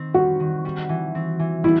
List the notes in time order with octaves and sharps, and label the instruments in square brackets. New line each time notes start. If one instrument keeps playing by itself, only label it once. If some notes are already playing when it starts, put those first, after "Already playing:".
Already playing: [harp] D#3 C4
[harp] G3 [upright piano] F#4
[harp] D#3
G3
E3
C4
E3
[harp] G3 [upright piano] E4